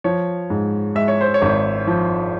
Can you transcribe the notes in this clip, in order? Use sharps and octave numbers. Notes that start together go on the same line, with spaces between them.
F3 C#5
G#2
G#3 E5
C#5
C5
C#5
G#1
F3